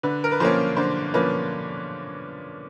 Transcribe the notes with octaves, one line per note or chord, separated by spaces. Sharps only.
D3 B4
A#4
B4
F3 A#3 C#4 C5
D3 C5
F3 A#3 C#4 B4